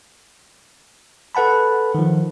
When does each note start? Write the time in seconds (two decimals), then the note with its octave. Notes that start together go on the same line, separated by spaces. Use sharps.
1.35 A4 B4 F#5 A5 B5
1.95 D#3 F3